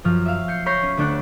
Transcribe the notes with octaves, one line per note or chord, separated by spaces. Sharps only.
F#2 F3 F6
E5 F5
G6 C7 C#7
C#5 B5 G6 A#6 C7
C#4
D2 A3 D4 A4 F#6